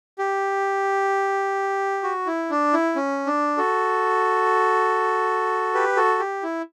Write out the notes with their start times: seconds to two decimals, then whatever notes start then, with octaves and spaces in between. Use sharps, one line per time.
0.19 G4
2.03 F#4
2.26 E4
2.50 D4
2.73 E4
2.96 C#4
3.26 D4
3.58 F#4 A4
5.74 G4 B4
5.97 F#4 A4
6.19 G4
6.43 E4